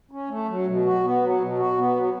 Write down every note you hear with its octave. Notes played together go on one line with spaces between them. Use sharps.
C#4
A3
F#3
B2
F#4
B3
F#3
B2
F#4
B3
F#3